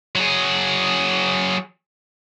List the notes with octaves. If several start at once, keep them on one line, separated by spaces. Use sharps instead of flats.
F#3 G#4